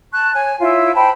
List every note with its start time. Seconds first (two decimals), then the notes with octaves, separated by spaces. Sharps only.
0.13 A5 C#6 F#6
0.34 C#5 G#5
0.60 E4 F4 C#5 E5
0.94 C5 G5 A5 B5